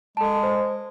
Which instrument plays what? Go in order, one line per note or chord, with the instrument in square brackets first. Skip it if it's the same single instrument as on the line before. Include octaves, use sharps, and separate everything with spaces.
[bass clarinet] G#3 [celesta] A4 A5
[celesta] C5